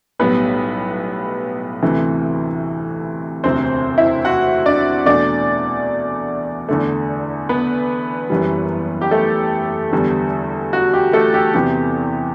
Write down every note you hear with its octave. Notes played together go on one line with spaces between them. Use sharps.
B1 A2 G3 B3 B4
D2 C3 E3 A3
E1 D2 C3 C4 C5
E4 E5
F#4 F#5
D4 D5
E2 B2 A3 D4 D5
E2 D3 A3
B3 B4
F#1 F#2 E3 G3
G4
A3 A4
E2 D3 G3 B3
F#4
G4
A3 A4
G4
E2 C3 E3 B3 G4